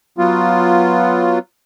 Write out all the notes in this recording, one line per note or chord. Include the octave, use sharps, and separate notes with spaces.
F#3 B3 F4